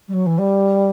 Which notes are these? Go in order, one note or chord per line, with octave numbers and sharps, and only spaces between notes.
G3
F#3
E3
G3